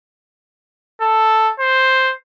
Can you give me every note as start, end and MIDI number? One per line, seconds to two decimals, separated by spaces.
1.01 1.52 69
1.59 2.14 72